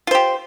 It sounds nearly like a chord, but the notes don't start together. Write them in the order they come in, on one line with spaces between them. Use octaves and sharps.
F4 C5 G4